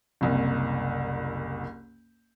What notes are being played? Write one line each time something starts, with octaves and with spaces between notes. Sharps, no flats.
F#1 C2